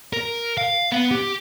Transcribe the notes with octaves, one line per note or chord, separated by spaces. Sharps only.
A#4
F5
B3
G4